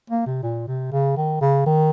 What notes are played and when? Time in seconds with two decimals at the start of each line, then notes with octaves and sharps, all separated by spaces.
0.10 A#3
0.26 C3
0.43 A#2
0.68 C3
0.92 C#3
1.17 D#3
1.42 C#3
1.66 D#3